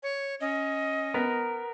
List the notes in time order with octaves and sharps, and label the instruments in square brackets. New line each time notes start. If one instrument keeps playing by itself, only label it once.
[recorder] C#5
[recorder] C#4 [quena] D#5
[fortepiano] B3 [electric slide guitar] A#4